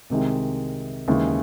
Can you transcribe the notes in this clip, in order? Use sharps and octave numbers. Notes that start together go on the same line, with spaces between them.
C2 C3 D#3 G#3
D#2 C#3 E3 G#3